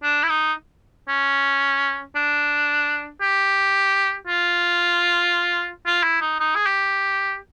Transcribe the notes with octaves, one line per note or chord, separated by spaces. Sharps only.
D4
E4
D#4
C#4
D4
G4
F4
F4
E4
D#4
D#4
G#4
G4